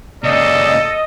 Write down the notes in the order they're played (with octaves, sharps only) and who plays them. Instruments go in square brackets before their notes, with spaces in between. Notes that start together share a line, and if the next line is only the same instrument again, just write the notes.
[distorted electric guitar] A#2 C#3 [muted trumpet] A4 [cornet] D5 [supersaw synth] D#5